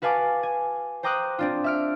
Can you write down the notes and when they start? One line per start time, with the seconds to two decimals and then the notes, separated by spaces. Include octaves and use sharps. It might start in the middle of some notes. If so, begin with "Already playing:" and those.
0.02 F#4 B4 F5 G#5 A5 D6
0.43 G#5
1.03 C5 G5 A#5 D6 D#6 F#6
1.39 C4 D4 F4
1.64 E5 F6 D7